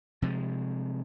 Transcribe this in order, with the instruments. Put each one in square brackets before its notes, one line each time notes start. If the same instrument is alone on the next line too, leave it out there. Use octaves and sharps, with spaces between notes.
[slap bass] C3 F3 G#3